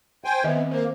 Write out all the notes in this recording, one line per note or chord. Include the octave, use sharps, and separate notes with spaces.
C5 G5 G#5
D#3 B3 D#5 E5
C4
A#3 C5